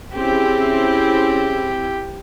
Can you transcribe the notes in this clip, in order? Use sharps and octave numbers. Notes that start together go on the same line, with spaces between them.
C4 C#4 E4 G4 G#4